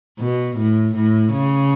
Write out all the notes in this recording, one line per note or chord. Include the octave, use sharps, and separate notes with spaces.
B2
A2
A2
C#3